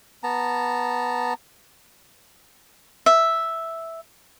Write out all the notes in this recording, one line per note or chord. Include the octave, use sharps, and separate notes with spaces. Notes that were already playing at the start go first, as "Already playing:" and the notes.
B3 A5 A#5
E5